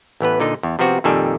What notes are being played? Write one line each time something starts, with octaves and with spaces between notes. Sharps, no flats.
A1 E3 B3 B4
A#2 D3 D#4 D#5
E2
C3 F3 B3 C4 F#4
F2 A#2 D#3 G3 A4 G#5